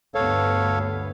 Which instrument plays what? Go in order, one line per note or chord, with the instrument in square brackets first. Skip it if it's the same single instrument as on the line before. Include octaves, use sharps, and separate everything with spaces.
[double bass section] D2 G2 B3 [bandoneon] A4 C#5 F5